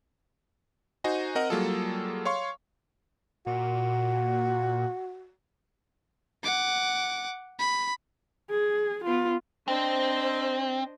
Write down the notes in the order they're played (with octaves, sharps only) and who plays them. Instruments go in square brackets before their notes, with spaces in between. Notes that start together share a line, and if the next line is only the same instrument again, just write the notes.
[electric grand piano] D#4 F#4 C5 D#5 G#5
C4 A#4 D#5 F#5
F#3 G3 A#3 F4 G#4 A4
C#5 F5 C6 C#6
[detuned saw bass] A#2 [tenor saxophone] F#4
[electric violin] F#5 D6
B5
[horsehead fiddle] G#4
B3 F4
[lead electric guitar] C4 [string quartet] D4 C5 D#5